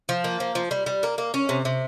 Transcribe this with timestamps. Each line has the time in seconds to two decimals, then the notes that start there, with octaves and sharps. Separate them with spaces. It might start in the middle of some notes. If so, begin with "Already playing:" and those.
0.09 F3
0.24 A#3
0.40 F3
0.55 F3
0.71 G3
0.86 G3
1.03 A#3
1.18 A#3
1.34 C#4
1.49 C3
1.65 C3